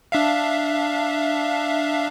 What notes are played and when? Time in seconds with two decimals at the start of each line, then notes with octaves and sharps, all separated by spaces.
0.12 D4 E5 F5